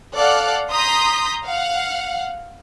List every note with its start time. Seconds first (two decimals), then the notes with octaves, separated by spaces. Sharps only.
0.15 A4 D5 F5 F#5 F#6
0.71 A#5 C6 D#6 G6 B6
1.46 F5 F#5